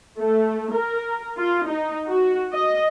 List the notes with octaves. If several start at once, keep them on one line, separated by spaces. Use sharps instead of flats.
A3
A#4
F4
D#4
F#4
D#5